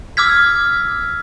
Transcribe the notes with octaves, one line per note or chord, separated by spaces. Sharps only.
D6 E6 F6 G#6 B6